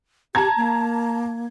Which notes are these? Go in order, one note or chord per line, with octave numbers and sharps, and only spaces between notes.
G4 A5 A#5 G#6
A#3